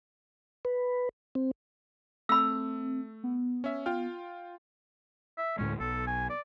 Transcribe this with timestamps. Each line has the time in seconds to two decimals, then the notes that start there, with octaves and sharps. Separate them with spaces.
0.65 B4
1.35 C4
2.29 A3 C4 B5 E6
3.24 B3
3.64 C#4 E5
3.86 F4 G5 F6
5.38 E5
5.58 D2 A2 G#3 C#4
5.80 B1 A4
6.07 G#5
6.30 D5